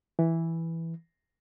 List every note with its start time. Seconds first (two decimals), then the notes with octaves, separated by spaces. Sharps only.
0.19 E3